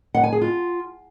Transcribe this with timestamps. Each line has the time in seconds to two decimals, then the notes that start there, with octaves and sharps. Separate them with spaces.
0.15 F#5
0.23 G#5
0.32 G#4
0.41 F4